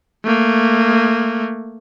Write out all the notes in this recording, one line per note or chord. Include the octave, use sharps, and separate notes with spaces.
A3 A#3